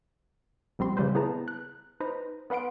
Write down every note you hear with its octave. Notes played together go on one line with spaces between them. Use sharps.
A#1 G3 C4 C6
C#3 G3 C4 B4 C5
B3 E4 G#4 B4 A5 A#5
F#6
D#4 B4 C5 A#5
B3 B4 F#5 C6 D7